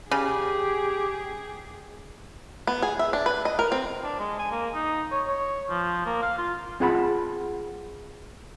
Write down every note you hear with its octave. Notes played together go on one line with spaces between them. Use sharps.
C#3 G4 G#4
B3
G#4
E5
D4
B4
D#5
A#4
C4
D4
G#3
G#5
A#3
D#4
C#5
C#5
F3
A#3
F5
F4
C4 F4 G#4 F#5 A5 B5